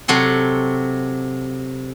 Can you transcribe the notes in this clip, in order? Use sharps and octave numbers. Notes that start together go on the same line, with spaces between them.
C3 F#3 A4 C6